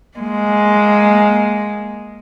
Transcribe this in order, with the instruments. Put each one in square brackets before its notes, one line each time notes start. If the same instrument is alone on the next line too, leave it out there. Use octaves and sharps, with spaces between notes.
[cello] G#3 A#3